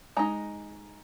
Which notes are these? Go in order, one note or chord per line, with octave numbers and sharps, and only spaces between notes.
G#3 D#4 A#5